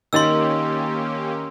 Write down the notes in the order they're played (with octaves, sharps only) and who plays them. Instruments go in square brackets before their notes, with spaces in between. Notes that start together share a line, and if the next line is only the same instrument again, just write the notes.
[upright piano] D#3 D#4 A6 [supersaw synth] A#3 C#4 G4 [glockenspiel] C6 E6